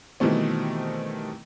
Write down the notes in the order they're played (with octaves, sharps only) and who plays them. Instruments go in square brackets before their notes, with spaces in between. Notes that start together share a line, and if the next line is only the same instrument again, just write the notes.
[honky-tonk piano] B2 D#3 E3 G3 A3 C4